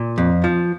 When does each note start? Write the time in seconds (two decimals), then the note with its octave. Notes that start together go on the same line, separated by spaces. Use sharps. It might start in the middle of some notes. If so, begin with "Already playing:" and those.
Already playing: A#2
0.18 F2
0.44 F3